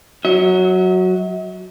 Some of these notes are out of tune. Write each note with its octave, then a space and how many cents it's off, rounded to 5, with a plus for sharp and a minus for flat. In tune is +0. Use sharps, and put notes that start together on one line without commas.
F#3 +0 E5 -45